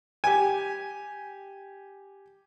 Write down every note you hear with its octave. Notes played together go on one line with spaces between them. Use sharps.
G4 G#5